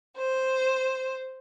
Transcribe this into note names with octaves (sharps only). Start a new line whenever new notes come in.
C5